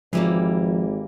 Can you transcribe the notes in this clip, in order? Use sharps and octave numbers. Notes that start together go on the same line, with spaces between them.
G#1 E3 F3 G3 A#3